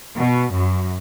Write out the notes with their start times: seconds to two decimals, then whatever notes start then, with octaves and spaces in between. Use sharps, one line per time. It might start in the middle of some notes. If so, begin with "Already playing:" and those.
0.17 B2
0.53 F#2